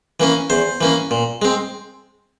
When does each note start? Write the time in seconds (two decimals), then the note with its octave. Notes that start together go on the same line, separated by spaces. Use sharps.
0.20 E3 A#3 C#4
0.50 E2 C5
0.81 E3 A#3 C#4
1.11 A#2
1.42 G#3 C4